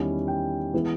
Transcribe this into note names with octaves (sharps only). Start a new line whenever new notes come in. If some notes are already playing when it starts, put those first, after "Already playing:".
Already playing: E2 D#3 G3 C#4 E4
G5
E3 G#3 B3 E4